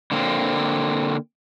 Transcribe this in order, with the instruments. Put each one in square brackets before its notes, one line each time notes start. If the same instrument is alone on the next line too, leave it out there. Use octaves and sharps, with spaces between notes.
[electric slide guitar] D3 A#3 C4